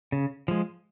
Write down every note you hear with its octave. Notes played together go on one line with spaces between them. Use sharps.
C#3
F3 G#3